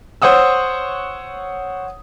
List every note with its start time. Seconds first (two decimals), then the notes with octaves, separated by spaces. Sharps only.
0.22 C5 C#5 F#5 D#6 E6